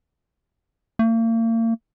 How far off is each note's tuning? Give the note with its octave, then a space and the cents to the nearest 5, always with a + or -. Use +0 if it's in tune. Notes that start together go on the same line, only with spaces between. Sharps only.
A#3 -40